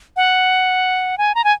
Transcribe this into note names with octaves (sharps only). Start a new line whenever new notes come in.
F#5
G#5
A#5
G#5